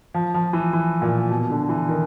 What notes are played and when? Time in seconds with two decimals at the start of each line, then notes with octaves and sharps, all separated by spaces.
0.14 F3
0.34 F3
0.53 E3
0.73 E3
1.02 A#2
1.30 B2
1.50 D3
1.69 E3
1.89 D#3